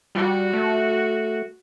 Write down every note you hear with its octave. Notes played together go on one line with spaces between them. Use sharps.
G3 F#4
A3